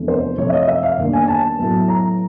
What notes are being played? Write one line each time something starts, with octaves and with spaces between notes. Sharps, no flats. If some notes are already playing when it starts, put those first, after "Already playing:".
Already playing: E2 C3 F3 A3 D4
C5
C3 F3 A3 C#5
E5
D#5
E5
F5
D#2 D#3 G3 B3 D4
G#5
A5
A2 F#3 B3
A#5